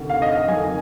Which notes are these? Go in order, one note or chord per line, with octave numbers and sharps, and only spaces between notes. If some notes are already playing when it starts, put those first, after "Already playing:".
Already playing: D2 C3 D#3
F5
D#5
F5
F2 D#3 G#5